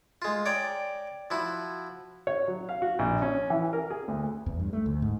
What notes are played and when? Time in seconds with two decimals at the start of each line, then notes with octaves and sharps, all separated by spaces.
0.22 G#3 F4
0.46 C#5 D5 G5 A#5
1.30 F3 E4 F#4
2.27 C#5
2.48 F#3
2.69 F5
2.82 F#4
2.99 A#1
3.22 C#4
3.50 E3
3.73 A#4
3.90 G#4
4.08 D2
4.46 E2
4.60 G2
4.73 A3
4.86 D2
5.02 G#2